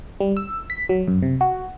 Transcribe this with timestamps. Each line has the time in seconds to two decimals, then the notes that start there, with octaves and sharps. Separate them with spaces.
0.20 G3
0.37 E6
0.70 B6
0.89 F#3
1.08 F#2
1.22 C3
1.41 F#4